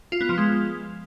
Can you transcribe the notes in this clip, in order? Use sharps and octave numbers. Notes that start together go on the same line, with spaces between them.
F4
B3
F3
G#3